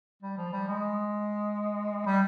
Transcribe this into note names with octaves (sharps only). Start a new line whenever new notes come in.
G3
F3
G3
G#3
G3